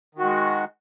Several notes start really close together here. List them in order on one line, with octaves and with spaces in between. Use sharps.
D#3 F#4 G#3